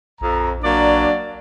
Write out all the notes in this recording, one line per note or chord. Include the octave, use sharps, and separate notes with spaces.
A#1 F2 A#5
F#3 A#3 D4 D5